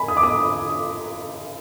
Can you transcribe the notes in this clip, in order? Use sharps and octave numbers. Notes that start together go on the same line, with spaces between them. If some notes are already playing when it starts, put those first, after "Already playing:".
Already playing: G#5 B5
D#6
D6
D#6